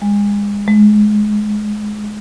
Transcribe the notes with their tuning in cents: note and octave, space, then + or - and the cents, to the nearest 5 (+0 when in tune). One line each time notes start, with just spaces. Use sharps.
G#3 -30
G#3 +20